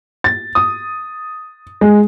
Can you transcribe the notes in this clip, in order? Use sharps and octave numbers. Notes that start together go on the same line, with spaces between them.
A6
D#6
G#3